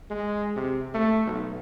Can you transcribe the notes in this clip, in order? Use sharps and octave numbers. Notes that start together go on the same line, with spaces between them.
G#3
C3
A3
B1